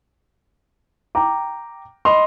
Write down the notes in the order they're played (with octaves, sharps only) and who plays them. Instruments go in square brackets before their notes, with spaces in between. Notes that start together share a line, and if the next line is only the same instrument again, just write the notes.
[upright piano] G5 A#5 D6
[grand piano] D#5 C6 [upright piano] B5 F7